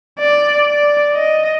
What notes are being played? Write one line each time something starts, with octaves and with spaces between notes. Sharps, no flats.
D5
D5
D#5